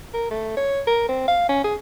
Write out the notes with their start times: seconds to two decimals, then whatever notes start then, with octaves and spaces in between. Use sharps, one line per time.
0.14 A#4
0.31 A3
0.57 C#5
0.87 A#4
1.09 C4
1.28 F5
1.49 C#4
1.64 G#4